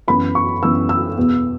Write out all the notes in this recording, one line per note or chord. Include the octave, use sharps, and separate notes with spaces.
F#2 E3 B3 B5
C#6
F#2 E3 B3 E6
E6
E2 B2 B3